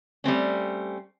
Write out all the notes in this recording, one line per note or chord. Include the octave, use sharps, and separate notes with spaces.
G3 A3 C4 C#4